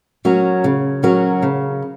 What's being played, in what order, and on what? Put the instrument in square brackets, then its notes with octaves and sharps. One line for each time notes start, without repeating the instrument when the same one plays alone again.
[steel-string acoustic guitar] F#3 C#4 F#4 A#4
C#3
F#3 C#4 F#4 A#4
C#3